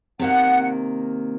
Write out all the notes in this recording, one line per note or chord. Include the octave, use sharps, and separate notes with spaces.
C3 D#3 A#3 F#5